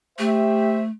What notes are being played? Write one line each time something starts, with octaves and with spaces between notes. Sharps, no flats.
A3 G4 C5 E5